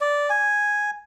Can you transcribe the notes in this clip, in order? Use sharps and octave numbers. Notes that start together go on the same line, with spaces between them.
D5
G#5